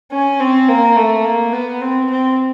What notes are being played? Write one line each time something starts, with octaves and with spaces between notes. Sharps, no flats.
C#4
C4
A#3
A3
A#3
B3
C4
C4